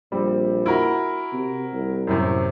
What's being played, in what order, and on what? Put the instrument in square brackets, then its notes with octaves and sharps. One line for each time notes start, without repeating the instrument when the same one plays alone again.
[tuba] A#1 [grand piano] G3 C4
[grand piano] E4 F#4 A#4
[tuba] C3
C2
[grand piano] F#2 A2 C3